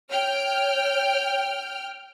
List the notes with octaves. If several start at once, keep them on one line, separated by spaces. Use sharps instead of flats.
C#5 G5 F6